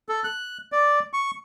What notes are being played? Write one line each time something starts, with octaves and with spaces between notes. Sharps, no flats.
A4
F#6
D5
C#6